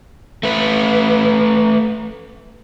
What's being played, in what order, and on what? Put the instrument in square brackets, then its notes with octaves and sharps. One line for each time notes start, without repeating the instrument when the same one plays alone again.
[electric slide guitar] A3 B4